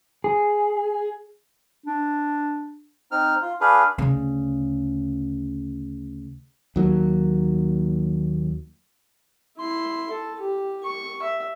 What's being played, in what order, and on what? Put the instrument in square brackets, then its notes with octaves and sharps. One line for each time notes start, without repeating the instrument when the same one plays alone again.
[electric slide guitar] G#4
[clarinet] D4
[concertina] C4 D#4 F6
F4
D4 G#4 B4 F5
[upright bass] D2 C#3
[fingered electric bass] D#2 F#3 A#3
[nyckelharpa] E4 C6
A4
G4
C#6
E5